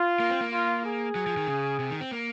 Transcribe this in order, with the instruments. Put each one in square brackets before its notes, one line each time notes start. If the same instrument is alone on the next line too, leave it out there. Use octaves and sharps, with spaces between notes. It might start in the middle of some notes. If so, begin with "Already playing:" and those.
Already playing: [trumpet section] F4
[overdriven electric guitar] A#3
C4
A#3
[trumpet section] F4
G#4
[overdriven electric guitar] F#3
F3
D#3
C#3
C3
D#3
C4
A#3